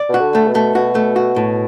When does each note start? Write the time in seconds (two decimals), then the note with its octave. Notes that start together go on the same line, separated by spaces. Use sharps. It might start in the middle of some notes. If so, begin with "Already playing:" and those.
Already playing: D5
0.09 B2 F#4
0.21 D3
0.35 A3
0.48 B2
0.55 A3
0.75 B2 F#4
0.95 A3
1.16 F#4
1.36 A2